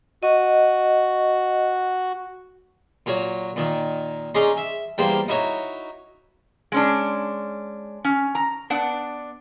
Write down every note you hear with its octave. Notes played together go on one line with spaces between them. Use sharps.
F#4 D#5
A#2 F#3 F#4 C#5
A#2 D#3
C#4 D#4 G#4 D5 A#5 C6
E5
E2 G3 A#3 C5 G5
D#4 E4 F#4 C#5
G#3 C#4 D4
C#4
A#5
B3 D4 F#5